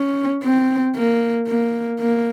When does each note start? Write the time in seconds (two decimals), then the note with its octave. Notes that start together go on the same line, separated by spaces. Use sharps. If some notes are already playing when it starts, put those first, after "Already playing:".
Already playing: C#4
0.43 C4
0.96 A#3
1.48 A#3
2.00 A#3